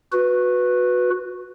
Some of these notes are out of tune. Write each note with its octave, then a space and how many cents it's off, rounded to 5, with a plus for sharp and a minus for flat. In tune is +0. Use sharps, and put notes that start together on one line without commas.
F#4 -20 B4 +0